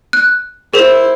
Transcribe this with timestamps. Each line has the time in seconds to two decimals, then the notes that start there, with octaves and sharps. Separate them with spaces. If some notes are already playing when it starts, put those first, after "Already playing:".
0.13 F#6
0.74 E4 G#4 A#4 C5 E7